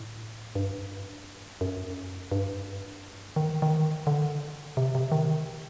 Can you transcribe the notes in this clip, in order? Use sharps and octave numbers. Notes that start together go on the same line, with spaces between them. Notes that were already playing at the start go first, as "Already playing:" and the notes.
Already playing: A2
G2
F#2
G2
D#3
D#3
D3
C3
C3
D#3